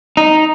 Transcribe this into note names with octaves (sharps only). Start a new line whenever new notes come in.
D#4